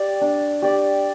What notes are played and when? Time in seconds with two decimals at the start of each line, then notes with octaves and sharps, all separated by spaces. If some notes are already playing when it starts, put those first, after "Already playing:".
Already playing: G4 D5
0.21 D4
0.62 G4 D5